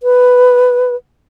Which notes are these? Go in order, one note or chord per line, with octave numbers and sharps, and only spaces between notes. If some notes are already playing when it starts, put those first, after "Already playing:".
B4